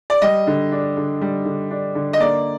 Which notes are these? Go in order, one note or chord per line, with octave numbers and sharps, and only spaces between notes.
D5
G3 D#5
D3
D4
D3
G3
D3
D4
D3
D#5
A#3 D5